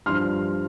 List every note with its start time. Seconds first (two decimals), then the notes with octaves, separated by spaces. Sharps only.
0.06 G2 F3 C6 F6